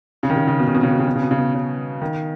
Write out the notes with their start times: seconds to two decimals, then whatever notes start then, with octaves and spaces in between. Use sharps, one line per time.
0.23 C#3
0.30 D#3
0.36 C#3
0.47 C#3
0.59 B2
0.67 C#3
0.75 B2
0.83 C#3
0.91 B2
0.99 C#3
1.07 B2
1.15 C#3
1.23 B2
1.31 C#3
1.38 B2
1.54 C#3
2.01 D#3